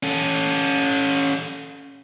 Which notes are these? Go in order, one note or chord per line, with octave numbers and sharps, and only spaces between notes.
C#4 A4